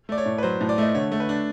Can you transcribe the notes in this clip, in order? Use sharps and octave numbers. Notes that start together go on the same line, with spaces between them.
A3 D5
C#5
A2
B4
F#3 C5
A2
D5
A3 D#5
D3 C#5
A3
B4
D4